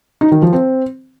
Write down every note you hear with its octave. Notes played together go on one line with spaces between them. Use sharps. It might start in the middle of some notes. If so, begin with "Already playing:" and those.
D#4
D#3
F3
C4